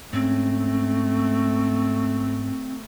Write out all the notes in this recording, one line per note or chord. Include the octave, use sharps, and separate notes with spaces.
G#2 A3 C4 C#4